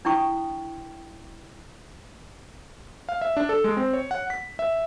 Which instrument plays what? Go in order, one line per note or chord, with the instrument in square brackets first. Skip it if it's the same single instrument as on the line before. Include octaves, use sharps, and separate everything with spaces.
[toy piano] D4 E4 G5 C#6 D#6
[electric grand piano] F5
E5
D4
A4
G#3
C4
C#5
F#5
B6
E5